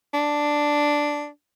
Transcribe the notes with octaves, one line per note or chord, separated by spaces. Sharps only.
D4